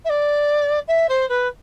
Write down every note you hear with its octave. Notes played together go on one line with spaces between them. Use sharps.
E5
D5
E5
C5
B4